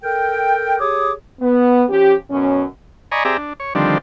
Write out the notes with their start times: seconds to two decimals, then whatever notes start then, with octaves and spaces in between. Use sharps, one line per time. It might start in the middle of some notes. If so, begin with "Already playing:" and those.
0.02 A4 A#4 G5
0.79 G4 G#4 C#5 D6 D#6
1.41 B3
1.89 F3 C#4 G4
2.31 F#2 B2 C#4
3.12 D5 D#5 G#5 A#5 B5 C#6
3.25 C4 G4 G#4 D5 E5 A#5
3.37 D4
3.60 C#5
3.75 D3 D#3 F3 G3 C4 D4